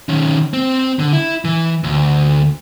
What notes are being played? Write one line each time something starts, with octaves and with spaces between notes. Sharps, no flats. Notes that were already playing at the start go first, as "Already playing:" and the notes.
D#3 C#4
C4
D3
E4
E3
D2